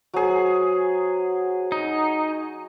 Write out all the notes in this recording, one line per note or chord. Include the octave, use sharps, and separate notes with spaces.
F#3 F#4 G#4 C5 C#5
D#4